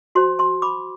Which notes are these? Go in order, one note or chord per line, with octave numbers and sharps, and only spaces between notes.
F#4 C5 A5 C6
A5 C6
B5 D6